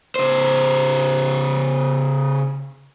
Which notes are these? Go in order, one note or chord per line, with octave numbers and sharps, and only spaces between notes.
C#3 C5